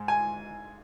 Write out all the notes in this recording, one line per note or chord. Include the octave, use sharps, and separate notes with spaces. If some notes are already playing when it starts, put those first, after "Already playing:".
Already playing: G#2 G#3
G#5